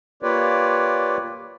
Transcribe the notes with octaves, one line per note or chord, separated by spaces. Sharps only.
A#3 F4 G4 B4 C#5 D5